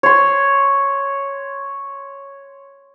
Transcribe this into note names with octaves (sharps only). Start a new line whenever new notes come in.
C#5 C6